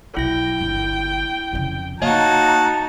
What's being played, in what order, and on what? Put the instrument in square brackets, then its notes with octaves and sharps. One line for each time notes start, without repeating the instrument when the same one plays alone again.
[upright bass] B1 [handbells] E4 A#6 [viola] G5
[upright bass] G1
F2 C#3
[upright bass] A#3 [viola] D#4 A#5 [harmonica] F#4 A5 [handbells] C#5 D#5 F5